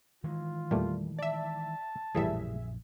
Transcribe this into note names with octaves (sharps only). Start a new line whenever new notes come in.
D#3 E3 G#3 F4
E2 A#2 G3 A3
D5 E5 A5
A#1 F#2 A2 C#3 E3 G3 G#4 E5